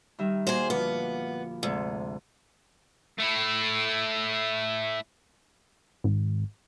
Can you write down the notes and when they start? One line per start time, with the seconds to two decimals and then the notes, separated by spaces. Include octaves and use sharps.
0.19 D#3 G3 E5
0.47 A#2 F#4 G#4 C5
0.70 D2 F3 B3
1.63 D2 G#2 C3
3.18 A3 E4
6.04 G#1